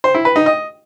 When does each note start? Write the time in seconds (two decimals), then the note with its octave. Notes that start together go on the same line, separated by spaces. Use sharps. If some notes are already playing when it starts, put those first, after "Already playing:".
0.04 C5
0.15 E4
0.25 B4
0.36 D#4
0.46 D#5